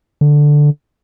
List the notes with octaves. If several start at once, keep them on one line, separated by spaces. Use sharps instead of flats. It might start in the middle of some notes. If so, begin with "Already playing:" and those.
D3